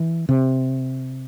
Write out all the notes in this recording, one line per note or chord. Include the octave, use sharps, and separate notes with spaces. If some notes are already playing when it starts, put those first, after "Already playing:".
Already playing: E3
C3